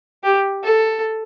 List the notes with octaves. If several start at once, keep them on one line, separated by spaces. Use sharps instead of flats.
G4
A4